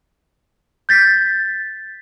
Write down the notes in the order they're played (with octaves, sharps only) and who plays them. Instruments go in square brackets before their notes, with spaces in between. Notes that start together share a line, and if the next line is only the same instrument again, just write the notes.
[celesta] G6 A6 B6